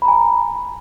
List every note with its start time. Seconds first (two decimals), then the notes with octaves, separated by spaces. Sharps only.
0.02 B5
0.05 A#5
0.08 G#5